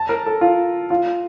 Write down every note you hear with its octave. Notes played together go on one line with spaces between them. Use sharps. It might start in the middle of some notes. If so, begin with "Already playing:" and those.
Already playing: A5
A#4
A4
F4
F4